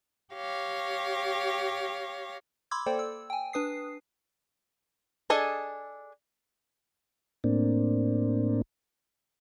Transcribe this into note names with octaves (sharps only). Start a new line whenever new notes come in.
G4 C#5 F5 A#6
B5 C6 D6 E6 G#6
A#3 A4 C5 D5 G5
E6
G5 G#5
D4 B4 D#6 C7
D4 G#4 A4 D#5 G#5
A2 A#3 C4 D4